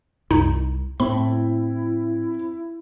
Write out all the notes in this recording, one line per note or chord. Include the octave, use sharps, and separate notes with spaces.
C2 F#2 D#4
A2 C4 E4 B5